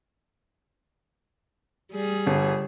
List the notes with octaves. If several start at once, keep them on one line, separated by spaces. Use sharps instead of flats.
G3 G#4
G1